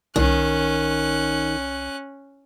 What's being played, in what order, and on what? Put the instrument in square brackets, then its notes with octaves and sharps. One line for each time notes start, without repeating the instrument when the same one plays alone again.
[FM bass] C2 [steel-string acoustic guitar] D#3 [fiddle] C#4 F#6